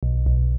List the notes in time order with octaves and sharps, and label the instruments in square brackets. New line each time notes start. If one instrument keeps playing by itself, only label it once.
[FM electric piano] B1
B1